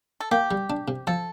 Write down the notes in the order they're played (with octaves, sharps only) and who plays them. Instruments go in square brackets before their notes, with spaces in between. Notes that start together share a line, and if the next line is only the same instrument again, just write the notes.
[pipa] A4
[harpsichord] A#3 [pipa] G4
[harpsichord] G3
D4
C3
[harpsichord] F3 [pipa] A4